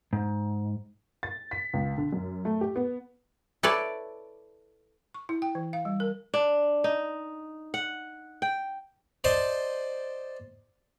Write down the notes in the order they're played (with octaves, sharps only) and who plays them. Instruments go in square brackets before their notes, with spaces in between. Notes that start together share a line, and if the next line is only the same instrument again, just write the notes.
[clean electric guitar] G#2
[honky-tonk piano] A6
B6
C#2
D3
F#2
A3
G4
B3
[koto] E4 A4 B4 C#5 D5
[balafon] C#6
E4
G5
E3
F5
G3
A#4
[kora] D4
D#4
F#5
G5
[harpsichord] C5 D5 D#5 A5 C6